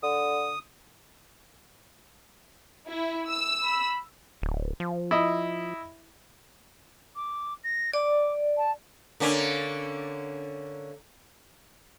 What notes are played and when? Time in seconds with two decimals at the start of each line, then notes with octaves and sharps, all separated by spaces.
0.03 D3 D#6
2.87 E4
3.30 E6
3.64 B5
4.42 D1
4.80 F3
5.11 E4 D#5
7.16 D6
7.64 A#6
7.94 D5 D6
8.57 A5
9.20 D3 A#3 C#4